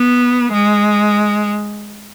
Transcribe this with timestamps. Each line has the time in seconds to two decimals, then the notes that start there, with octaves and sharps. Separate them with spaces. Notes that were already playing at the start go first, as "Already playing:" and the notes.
Already playing: B3
0.52 G#3